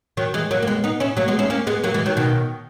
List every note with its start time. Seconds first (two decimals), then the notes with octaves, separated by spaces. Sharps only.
0.17 D#3 F#3
0.34 E3 G#3
0.51 F#3 A#3
0.62 A#3
0.67 G#3 B3
0.84 B3 D#4
1.00 C#4 E4
1.17 F#3 A#3
1.28 G#3 B3
1.39 C#4 E4
1.50 A#3 C#4
1.67 G#3 B3
1.84 F#3 A#3
1.94 E3 G#3
2.06 D#3 F#3
2.17 B2 D#3